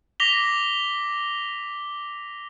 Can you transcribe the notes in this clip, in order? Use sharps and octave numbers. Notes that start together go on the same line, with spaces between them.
D6 A#6 B6 F7 G7